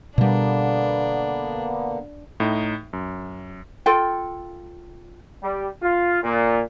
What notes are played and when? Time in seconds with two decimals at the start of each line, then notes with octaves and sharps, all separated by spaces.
0.18 B2 D3 G3 A#3 B3 D4
2.40 A2 D#4
2.93 F#2
3.86 F4 A4 G5
5.43 G3
5.82 F4
6.23 A#2